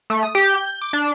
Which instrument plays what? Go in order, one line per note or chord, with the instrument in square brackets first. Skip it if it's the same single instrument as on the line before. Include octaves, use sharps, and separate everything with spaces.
[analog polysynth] A3
D#6
G4
G6
G6
D6
D4